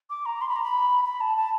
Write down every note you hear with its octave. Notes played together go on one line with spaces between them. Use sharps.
D6
A#5
C6
B5
A#5
B5
B5
A5
A5